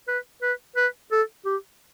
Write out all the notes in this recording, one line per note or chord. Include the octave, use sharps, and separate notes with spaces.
B4
B4
B4
A4
G4